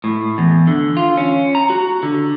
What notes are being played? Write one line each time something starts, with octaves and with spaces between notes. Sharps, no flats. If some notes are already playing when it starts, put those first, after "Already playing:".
A2
E2
D3
F4
C#4
A#5
F#4
D3